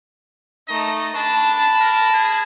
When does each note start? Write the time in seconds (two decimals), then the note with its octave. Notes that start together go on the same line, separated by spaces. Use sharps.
0.69 A3 D#4 D#5
1.15 D4 A5 B5
1.80 A#4
2.14 G#4